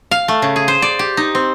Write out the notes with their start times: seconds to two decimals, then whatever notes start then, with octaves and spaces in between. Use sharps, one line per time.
0.11 F5
0.28 A3
0.42 C#3
0.56 G#4
0.68 C5
0.82 D5
0.99 G4
1.17 D#4
1.35 C4